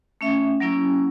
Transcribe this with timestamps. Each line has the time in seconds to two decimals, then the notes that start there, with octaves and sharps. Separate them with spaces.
0.21 A3 C#4 E5
0.60 F#3 A#3 C#4 E4